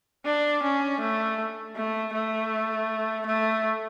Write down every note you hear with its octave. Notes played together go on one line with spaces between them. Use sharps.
D4
C#4
A3
A3
A3
A3